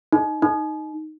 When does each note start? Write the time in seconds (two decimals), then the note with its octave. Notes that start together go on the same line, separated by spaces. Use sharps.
0.12 D#4
0.42 D#4